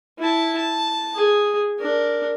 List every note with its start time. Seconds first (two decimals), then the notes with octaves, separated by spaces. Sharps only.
0.19 E4 A5
0.58 A5
1.15 G#4
1.79 D4 A#4